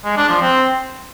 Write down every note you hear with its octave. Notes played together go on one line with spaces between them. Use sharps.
G#3
D4
F3
C4